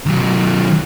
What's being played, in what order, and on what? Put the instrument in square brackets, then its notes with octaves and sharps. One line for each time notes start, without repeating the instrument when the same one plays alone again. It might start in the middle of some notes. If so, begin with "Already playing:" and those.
[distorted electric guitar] D#3 F#3